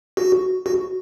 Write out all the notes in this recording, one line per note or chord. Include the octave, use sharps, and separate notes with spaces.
F#4
F#4